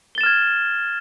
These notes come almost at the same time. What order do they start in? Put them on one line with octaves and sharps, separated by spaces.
G7 A6 E7 F6 G#6